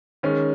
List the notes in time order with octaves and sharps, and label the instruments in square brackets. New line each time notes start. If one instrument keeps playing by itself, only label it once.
[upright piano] D#3 G#3 C#4